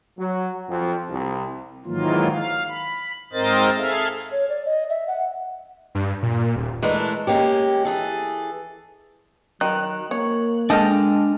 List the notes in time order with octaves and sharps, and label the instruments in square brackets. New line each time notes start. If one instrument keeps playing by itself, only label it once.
[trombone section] F#3
F2
C2
[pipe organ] G#2 D#3 E3 F#3 A#3 F4
F5
B5
G#2 C4 A#4 C5 D#5 A6
G#4 A4 E5 F5
[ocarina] C#5
D5
D#5
E5
F#5
[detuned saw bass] G2
A#2
D#1
[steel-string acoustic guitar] E3 G#3 A3 D4 A4 A#4
G#3 A#3 C#4 G4
E3 G#4 A4
[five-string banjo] D#3 [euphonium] F#3 [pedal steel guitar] F#6
[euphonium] A#3 [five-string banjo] C#5
[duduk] G#3 [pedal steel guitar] D4 F6 [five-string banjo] A4 D#5 G5